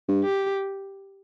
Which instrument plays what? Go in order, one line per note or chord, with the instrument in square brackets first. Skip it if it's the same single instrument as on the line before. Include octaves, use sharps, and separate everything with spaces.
[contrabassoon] G2
[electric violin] G4